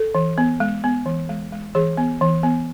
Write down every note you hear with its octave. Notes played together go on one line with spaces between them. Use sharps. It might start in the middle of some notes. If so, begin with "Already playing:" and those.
Already playing: A4
E3
B3
G#3
B3
E3
G#3
G#3
E3 G#4
B3
E3
B3